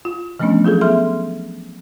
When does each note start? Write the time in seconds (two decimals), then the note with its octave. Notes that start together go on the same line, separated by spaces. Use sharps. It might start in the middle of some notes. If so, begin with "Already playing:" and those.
0.05 F4
0.39 E3 F3 A3 B3 C#4 D4
0.64 F#3 F4 G#4 A4
0.81 B3 A4 E5 C6 F6